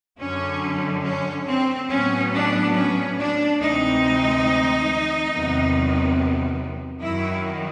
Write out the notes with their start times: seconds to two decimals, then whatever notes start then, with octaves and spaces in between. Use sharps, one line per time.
0.19 F#2 D3 F#3 C#4
1.03 C#4
1.47 C4
1.89 A2 F#3 B3 C#4
2.32 D4
2.74 C#4
3.18 D4
3.59 D2 C3 E3 G#3 C4 D#4
5.30 E2 C3 D#3 F#3 B3
7.00 F#2 D#3 F#3 E4